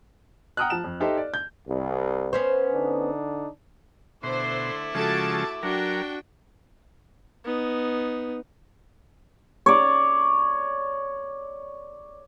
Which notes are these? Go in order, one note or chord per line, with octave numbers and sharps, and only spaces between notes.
F#5 G5 A#5 D#6 F6 F#6
F3 A5 E7
F2
D#4 G4 A4 C5 D#5 E5
D5
G6
C2
B3 C#4 C5
D3 D4 D#4
B2 D3 A3 E4 C5 C6 D6
C#3 F3 G#3 F#4 A4 A5 D7
F#3 D4 F#4 A#4 G5
B3 D#4
C#5 D5